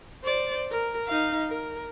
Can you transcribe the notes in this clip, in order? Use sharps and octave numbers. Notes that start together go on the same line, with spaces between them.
C5 D5
A#4
D#4 F5
A#4